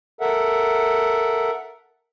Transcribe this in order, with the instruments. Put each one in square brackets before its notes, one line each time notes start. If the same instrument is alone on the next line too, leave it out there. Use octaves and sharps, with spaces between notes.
[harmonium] A4 A#4 E5 F#5